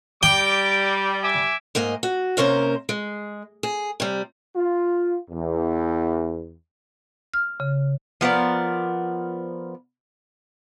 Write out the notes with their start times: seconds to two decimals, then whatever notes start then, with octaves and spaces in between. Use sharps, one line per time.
0.23 G3 G5 A#5 D6
1.23 E5 G#5 D6
1.75 G#2 A#3 D#5 G#5
2.03 F#4
2.37 C3 A#3 C#4 A#4 C5
2.89 G#3
3.63 G#4
4.00 C3 G3
4.56 F4
5.30 E2
7.34 F6
7.60 C#3
8.21 F3 B3 A#4 D5